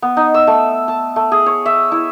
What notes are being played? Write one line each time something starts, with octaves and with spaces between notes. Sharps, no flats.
B3
D#4
E6
A3
A5
A3
G#4
C#5
E5
E4